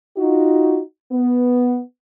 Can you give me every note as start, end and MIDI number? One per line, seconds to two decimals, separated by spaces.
0.17 0.80 63
0.17 0.80 65
0.17 0.80 66
1.12 1.81 59